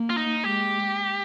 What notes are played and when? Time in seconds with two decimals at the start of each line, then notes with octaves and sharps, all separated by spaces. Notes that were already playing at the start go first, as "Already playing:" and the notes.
Already playing: A#3
0.10 F4
0.17 D#4
0.44 G#3 G4